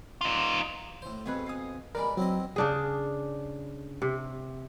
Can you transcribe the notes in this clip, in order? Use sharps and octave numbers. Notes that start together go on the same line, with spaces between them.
D#4 F4
A2 C5
F2 B2 A3 G#4 B4
F5 G#5 D#6
G3 G#3 A#4 B4 D5 B5
F#3 C4 E4 D#5
C#3 D4 G#4
C3